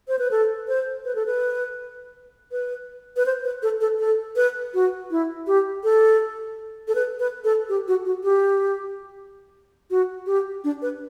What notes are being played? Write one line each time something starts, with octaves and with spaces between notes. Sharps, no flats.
C5
B4
A4
C5
B4
A4
B4
B4
B4
C5
B4
A4
A4
A4
B4
F#4
E4
G4
A4
A4
B4
B4
A4
G4
F#4
F#4
G4
F#4
G4
D4
B4